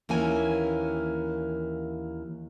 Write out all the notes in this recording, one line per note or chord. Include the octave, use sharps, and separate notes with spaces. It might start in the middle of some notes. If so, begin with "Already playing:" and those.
D#2 E3 A#3 C#4 G#5